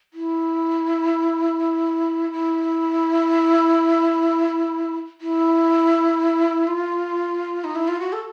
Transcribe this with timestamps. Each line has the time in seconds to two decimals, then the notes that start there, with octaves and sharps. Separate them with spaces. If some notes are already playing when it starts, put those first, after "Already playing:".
0.14 E4
2.32 E4
5.21 E4
6.67 F4
7.64 D#4
7.75 E4
7.88 F4
8.00 F#4
8.13 A4